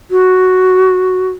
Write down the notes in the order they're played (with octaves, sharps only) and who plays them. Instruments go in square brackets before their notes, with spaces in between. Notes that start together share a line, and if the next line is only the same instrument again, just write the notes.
[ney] F#4